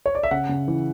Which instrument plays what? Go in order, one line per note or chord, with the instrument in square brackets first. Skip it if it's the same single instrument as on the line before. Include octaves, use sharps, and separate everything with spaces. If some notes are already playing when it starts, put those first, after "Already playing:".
[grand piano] C#5
D5
E5
C#3 F#5
C#3
E3